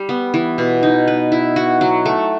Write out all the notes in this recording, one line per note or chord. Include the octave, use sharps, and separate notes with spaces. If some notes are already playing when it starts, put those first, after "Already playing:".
Already playing: G3
B3
E3
B2
D#4
B4
E4
F#4
F#3
A3